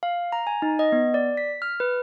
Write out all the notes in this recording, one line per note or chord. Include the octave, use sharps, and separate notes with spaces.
F5
A#5
G#5
D#4
D#5
B3
D5
B6
F6
B4